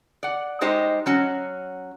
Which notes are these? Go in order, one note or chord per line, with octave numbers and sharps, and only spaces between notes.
D5 F#5
G3 G#3 D#4 G4 C5 D#5
F#3 C#4 F#4